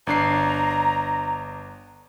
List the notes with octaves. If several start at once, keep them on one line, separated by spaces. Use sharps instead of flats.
G1 D4 A#5 C7